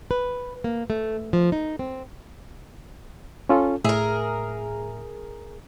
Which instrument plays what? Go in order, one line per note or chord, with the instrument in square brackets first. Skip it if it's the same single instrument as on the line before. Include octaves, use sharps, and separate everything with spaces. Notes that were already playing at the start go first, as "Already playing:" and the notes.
[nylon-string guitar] B4
A#3
A3
F3
D#4
C4
[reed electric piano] C#4 F4 A4
[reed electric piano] A2 E5 [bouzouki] G#4 A#4